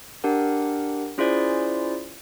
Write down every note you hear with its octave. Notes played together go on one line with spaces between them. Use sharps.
D4 G4 A#4 F#5
C#4 E4 F4 G#4 C5 D5